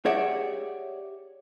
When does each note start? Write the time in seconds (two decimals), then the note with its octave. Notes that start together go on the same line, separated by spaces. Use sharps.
0.05 G4 G#4 C#5 D5 E5 F#5